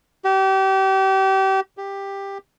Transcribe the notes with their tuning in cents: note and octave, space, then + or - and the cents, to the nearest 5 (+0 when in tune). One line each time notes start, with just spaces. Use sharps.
G4 -30
G4 +10